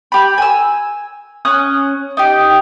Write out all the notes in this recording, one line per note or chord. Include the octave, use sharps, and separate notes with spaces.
G4 B5
G#5 E6
C#4 D#6 F#6
D#4 G4